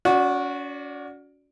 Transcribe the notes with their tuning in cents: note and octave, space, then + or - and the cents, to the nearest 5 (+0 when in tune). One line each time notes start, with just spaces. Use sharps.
C#4 +40 F#4 -10 D5 +0